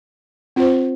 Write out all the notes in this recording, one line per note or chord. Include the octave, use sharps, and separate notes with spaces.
C4 F4 C5